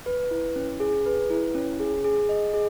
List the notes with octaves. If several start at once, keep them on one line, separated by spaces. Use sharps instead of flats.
B4
E4
C#4
G#4
B4
E4
C#4
G#4
G#4
D#5
G#4